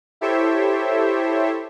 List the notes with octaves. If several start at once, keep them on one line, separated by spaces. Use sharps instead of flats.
E4 G4 A4 C5 C#5 E5